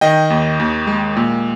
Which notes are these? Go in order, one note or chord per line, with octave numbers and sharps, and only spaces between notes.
D#3 D#5 G5
D#2
D#2
G#3
A#2